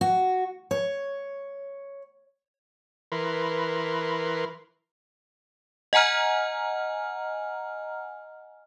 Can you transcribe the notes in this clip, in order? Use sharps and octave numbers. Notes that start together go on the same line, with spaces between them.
F#4
C#5
E3 A#4 B4 C6
D#5 F#5 G#5 A#5 F6